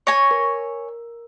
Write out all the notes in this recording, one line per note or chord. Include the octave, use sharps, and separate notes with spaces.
C#5 G#5 C#6 A#6
A#4